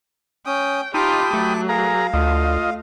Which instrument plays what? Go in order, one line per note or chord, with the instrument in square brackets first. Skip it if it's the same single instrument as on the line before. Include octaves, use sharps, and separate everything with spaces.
[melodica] C#4 D#6 [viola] G5
[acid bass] D#4 [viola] F4 G4 [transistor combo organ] G5 B5 D#6 [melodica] A5 D6
[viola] F#3 [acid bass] A3
[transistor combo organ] G#4 A#4 A#5 [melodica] F5
[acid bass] D2 [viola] A3 [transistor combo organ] F4 D#5